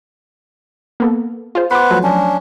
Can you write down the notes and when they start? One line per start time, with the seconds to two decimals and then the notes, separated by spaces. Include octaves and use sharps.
1.00 A#3 B3 A4
1.55 F4 G#4 C5
1.71 B3 B4 C5 B5 D6
1.90 F3 F#3 A3
2.03 C#4 D4